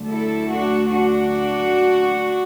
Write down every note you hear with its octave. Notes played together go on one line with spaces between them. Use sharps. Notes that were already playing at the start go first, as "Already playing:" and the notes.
Already playing: D2 D3 F#3 A3
E4 A4
D4 F#4
D4 F#4